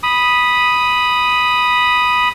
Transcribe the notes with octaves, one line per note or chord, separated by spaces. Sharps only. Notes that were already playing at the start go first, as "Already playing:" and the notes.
B5 D#6